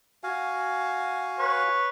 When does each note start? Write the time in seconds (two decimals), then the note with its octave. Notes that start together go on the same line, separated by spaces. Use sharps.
0.23 F#4 F5 G#5
1.39 B4 C#5